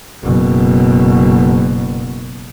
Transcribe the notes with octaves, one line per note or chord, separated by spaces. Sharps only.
F#1 B2